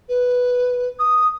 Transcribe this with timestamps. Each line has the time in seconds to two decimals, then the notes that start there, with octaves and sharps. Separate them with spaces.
0.08 B4
0.99 D#6